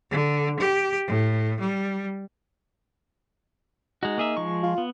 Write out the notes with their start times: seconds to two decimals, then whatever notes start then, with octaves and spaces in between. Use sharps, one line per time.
0.11 D3
0.60 G4
1.07 A2
1.60 G3
4.03 G#3 D#4 F#4
4.18 A#3 G#4 E5
4.37 F3 G#3 C#6
4.63 F4
4.78 B3